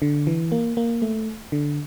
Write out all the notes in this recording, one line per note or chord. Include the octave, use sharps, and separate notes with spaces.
D3
E3
A#3
A#3
A3
D3